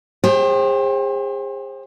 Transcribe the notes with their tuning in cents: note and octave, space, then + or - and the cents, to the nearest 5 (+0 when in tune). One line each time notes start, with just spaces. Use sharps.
G#4 -35 C5 +35 G5 +0